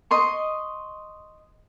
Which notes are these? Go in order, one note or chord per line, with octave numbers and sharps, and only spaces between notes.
D#5 C6 C#6